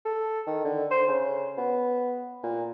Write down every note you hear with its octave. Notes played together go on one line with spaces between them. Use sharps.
A4
D#3
D3
C5
C#3
B3
A#2